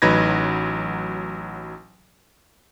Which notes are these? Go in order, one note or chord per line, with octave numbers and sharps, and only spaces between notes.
A1 F#3 D#4 B4 G#6 A#6